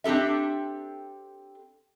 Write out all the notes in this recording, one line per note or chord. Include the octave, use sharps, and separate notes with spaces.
C4 D4 G4 A4 E5